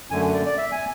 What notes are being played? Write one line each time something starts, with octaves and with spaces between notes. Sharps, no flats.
F#2 D3 A3 G#5
D5
D5
E5
G#5